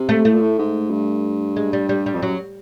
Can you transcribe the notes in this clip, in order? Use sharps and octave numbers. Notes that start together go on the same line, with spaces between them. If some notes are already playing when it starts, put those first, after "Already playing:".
Already playing: C3
A3
A2 A3
A#2
A2
G#2
G2
G#3
G3
G3
G3
F2
F#2 F#3